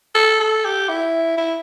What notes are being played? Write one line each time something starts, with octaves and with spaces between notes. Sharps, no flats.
A4
A4
G4
E4
E4